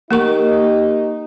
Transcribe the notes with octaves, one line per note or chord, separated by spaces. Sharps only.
A#3 D#4 G4 A#4 C#6